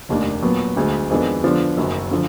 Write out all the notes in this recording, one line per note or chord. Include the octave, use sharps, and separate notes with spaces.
F1 D#2 D#3 A#3 D4
A#2 F#3 B3
D2 D3 G#3
F2 D#3 G#3 B3 D4
D3 F3 B3 D4
F#1 F#2 D#3 F#3
D3 F3